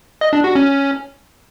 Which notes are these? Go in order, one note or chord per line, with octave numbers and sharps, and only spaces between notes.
D#5
D4
F#4
C#4